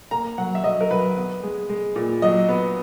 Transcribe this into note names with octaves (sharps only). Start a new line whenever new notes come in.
A#3 A#5
F#3 F#5
E5
F#3 D#5
A#4
F#3 B4
B3
G#3
G#3
A#2
F#3 D#5
B3